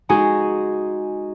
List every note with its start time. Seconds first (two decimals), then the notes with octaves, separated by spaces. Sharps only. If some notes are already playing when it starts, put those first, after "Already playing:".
0.09 G#3 D#4 F#4 G#4